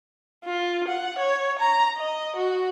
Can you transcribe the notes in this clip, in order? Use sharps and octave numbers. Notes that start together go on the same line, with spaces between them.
F4
F#5
C#5
A#5
D#5
F#4